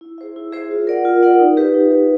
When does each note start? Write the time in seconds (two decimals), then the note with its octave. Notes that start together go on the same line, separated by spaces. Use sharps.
0.01 E4
0.18 G#4 C5 E5
0.36 E4
0.52 G#4 C5 E5
0.71 F4
0.87 A#4 D5 F#5
1.05 F4
1.22 A#4 D5 F#5
1.39 D#4
1.57 G4 B4 E5
1.74 D#4
1.91 G4 B4 E5